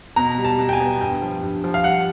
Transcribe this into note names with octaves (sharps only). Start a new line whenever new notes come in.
B2 A#5
G3
A5
B2
G5
G#5
B3
G2 G5
F3
G2
F3
F5
G3 F#5